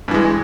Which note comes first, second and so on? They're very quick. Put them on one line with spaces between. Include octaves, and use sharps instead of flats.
G2 E3 G#3